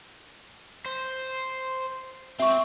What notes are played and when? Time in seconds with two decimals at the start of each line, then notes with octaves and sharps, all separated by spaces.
0.86 C5
2.39 C4 E5 C#6